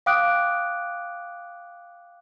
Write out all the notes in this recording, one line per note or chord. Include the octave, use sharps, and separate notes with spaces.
F5 G5 D6 D#6 F#6 D7